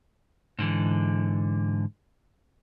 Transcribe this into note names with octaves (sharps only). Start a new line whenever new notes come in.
G#2 D3 E3